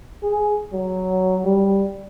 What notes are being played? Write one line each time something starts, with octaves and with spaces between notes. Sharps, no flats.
G#4
F#3
G3